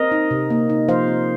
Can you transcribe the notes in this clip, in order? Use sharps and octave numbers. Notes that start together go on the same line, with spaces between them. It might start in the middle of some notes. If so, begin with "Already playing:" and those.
Already playing: C4 A#4 D#5
D#4
C3
A#3
D#4
F3 C5 F5
C4